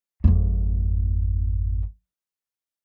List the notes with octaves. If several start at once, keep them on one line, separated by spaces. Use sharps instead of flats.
G#1 F2